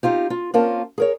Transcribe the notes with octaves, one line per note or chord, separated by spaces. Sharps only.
C4 D#4 F4 G4
F4
A#3 C4 C#4 F4 A#4 A5
G#4 A#4 C#5